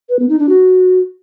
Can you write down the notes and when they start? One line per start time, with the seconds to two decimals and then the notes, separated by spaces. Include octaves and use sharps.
0.09 B4
0.19 B3
0.29 D#4
0.39 D4
0.49 F#4